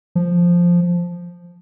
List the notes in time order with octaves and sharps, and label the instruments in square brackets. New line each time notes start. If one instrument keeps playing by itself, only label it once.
[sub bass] F3